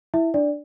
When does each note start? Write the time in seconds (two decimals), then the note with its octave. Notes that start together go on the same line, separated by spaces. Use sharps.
0.14 E4 E5
0.34 D4 D5